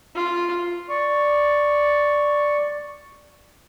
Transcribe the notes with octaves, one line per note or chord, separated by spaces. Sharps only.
F4
D5 C#6